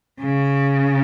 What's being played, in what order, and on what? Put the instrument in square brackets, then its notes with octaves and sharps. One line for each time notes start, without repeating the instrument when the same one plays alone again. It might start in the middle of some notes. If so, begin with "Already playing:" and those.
[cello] C#3